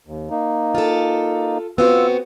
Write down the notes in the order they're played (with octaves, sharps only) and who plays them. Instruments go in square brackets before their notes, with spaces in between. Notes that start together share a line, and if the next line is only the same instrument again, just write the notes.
[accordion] D#2
A#3 D#4
[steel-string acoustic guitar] F4 A4
[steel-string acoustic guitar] B3 C4 F#4 [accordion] F4 E6